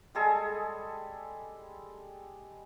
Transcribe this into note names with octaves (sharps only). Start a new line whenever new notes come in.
G3 G#3 G#4 A4